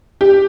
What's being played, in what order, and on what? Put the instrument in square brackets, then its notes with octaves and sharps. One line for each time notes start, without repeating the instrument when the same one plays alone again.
[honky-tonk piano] G4